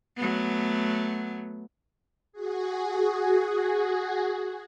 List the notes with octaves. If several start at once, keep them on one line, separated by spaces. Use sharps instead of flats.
F#3 A3 B3
F#4 G#4